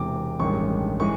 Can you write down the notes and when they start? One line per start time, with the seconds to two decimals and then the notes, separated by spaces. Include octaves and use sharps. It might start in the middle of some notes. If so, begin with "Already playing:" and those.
Already playing: E1 E2 C3 E3 D6
0.40 A1 G2 D#3 G#3 C#6
1.00 E3 G#3 C#6